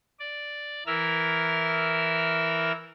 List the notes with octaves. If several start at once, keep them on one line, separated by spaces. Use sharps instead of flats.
D5
E3 E4 A#4 E6 F6